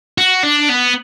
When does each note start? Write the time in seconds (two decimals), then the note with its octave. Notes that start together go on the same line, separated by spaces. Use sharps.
0.18 F#4
0.44 D4
0.70 B3